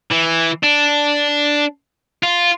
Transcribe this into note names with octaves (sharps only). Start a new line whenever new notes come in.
E3
D4
F4